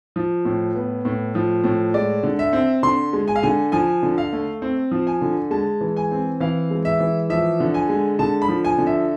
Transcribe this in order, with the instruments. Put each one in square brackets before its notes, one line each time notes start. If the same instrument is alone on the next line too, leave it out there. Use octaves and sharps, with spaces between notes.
[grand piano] F3
A2
B3
A2
F3
A2
G#3 D5
D3
E5
C4
D3 C6
G#3
G#5
F5
D3 G#5
F3 G#5
D3
F5
A3
C4
F3
G#5
D3
G#3 A5
E3
G#5
C4
E3 F5
G#3
E5
E3
F3 E5
D3
G#5
G#3
D3 A5
B5
F3
G#5
D3
E5